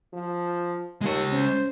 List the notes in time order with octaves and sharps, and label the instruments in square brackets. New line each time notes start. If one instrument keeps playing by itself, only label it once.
[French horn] F3
[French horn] D#2 [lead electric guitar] G#3 C#5
[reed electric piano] C#4 [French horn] C5